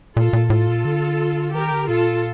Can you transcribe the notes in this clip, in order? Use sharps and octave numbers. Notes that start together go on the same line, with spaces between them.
A#2 F4 A4
A#2
A2 F4 A4
A#2
D3
D#3 G4 A#4
D3
A#2 F4 A4